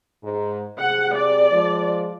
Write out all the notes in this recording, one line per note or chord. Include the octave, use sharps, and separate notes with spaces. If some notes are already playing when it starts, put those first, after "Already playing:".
G#2
C3 G#4 F#5
D5
F3 G#3